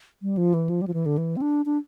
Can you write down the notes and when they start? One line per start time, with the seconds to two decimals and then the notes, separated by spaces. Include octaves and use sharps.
0.22 G3
0.37 F3
0.54 E3
0.69 F3
0.82 G3
0.88 F3
0.94 E3
1.06 D3
1.18 E3
1.37 C4
1.42 D4
1.66 D4